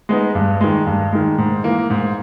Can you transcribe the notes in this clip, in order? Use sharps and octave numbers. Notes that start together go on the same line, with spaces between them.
G#3 B3 D#4
G2
D#3 G#3
G2
D#3 G#3
G#2
E3 A#3
G#2